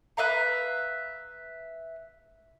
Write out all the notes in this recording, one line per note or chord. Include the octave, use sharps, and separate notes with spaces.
B4 E5 F5 A#5